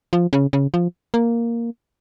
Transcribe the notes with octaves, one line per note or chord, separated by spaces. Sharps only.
F3
C#3
C#3
F3
A#3